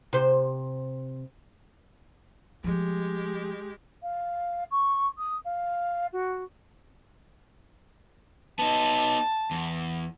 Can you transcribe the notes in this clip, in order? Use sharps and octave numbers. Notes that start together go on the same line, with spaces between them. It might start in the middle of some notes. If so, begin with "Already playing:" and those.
C3 C5
F3 G#3 A3 G4
F5
C#6
D#6
F5
F#4
B3 D#4 A5
E2